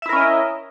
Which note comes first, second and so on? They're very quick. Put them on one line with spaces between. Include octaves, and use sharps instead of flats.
E5 E4 A#4 C#4 D#5